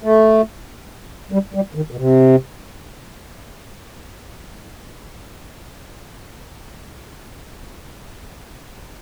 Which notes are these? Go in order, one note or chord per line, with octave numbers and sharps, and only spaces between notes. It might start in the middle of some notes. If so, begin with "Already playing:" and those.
A3
G3
G3
D#3
B2
C3